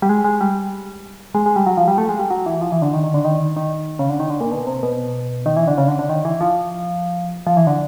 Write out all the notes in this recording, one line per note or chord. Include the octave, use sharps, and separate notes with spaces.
G3
G#3
G#3
G3
G#3
G#3
G3
F#3
F3
G3
A3
G#3
G3
F#3
E3
F3
E3
D3
D#3
D#3
D3
D#3
D#3
C#3
D3
D#3
D3
A#2
B2
C3
B2
D#3
E3
D3
C#3
D3
D3
D#3
E3
F3
F3
E3
D3